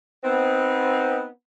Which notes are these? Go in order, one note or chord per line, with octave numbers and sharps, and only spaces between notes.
B3 C4 D#4